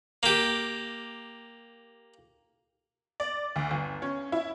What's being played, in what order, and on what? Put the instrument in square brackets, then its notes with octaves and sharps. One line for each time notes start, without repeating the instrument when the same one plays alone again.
[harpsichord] A#3 G4
[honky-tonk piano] D5
D2
G1
C#4
E4